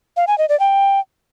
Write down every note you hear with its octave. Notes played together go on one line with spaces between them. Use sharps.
F5
G#5
D#5
D5
G5